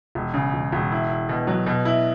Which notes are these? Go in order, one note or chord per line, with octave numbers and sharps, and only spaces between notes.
E1
C#3
E1
E1
E4
E4
B2
F#3
B2
E4